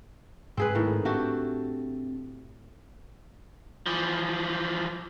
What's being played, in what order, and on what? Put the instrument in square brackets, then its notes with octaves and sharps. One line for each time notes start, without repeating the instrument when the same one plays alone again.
[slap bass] G#2 [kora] C4 G#4 B4
[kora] A2 D#3
[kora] A3 F#4 G4 [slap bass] C4 D4
[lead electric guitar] E3 F3